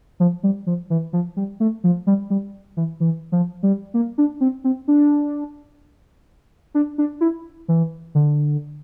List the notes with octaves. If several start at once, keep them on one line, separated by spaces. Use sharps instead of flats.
F3
G3
F3
E3
F3
G3
A3
F3
G3
G3
E3
E3
F3
G3
A#3
D4
C4
C4
D4
D4
D4
E4
E3
D3